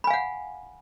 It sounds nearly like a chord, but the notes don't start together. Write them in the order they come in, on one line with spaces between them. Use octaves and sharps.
B5 G#5 F5 F#5